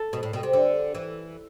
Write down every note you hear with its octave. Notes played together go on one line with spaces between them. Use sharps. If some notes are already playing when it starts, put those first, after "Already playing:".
Already playing: A4
B2
A2
B2
C3
D3
E3